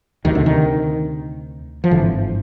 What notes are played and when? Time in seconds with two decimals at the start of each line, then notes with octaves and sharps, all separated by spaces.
0.25 D2 C3 D#3
0.35 D3
0.46 D#3
1.84 F3
1.91 G#1 G2 D3 E3